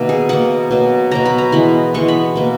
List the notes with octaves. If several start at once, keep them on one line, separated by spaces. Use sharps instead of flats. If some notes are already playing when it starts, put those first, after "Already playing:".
Already playing: B2 D#3 A#3 E5
G#4
B2 A#3 F#5
B2 F#3 A#3
B2 F#3 A#3 A#5
B5
A#5
E3 G#3 B3 B5
E3 G#3 B3 C#6
B5
B2 A#3